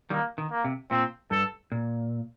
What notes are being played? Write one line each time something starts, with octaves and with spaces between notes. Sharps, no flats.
D#3 G3 A#3
D#3
A#3
C3
A#2 C4
G2 A4
A#2